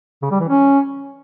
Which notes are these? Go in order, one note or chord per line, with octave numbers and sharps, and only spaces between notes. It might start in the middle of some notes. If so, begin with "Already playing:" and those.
C#3
G3
E3
C#4